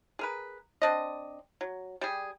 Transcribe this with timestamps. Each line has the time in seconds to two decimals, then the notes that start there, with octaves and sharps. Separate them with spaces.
0.19 G#4 A#4 B4
0.82 C4 D4 D#5
1.61 F#3
2.01 G3 G4 G#4